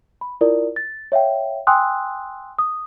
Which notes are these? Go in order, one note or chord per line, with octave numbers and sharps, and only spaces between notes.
B5
E4 F4 A#4 D5
A6
C#5 E5 F5 G5
G5 G#5 C6 D#6 E6 F#6
D#6